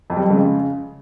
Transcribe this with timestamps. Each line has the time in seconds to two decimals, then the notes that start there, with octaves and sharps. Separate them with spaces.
0.10 F2
0.17 G3
0.30 C#3 G#3